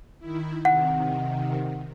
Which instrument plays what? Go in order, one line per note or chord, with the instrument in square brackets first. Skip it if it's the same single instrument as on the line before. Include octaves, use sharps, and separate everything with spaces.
[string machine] D#3 E4
[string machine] C3 D#3 [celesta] F#5